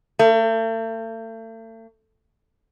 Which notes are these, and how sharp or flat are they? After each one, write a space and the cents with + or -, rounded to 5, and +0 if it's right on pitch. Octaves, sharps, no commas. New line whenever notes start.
A3 +40